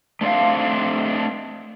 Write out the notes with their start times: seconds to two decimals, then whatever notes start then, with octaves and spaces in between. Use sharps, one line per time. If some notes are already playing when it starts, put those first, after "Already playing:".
0.21 A3 C4 D4 D5 F5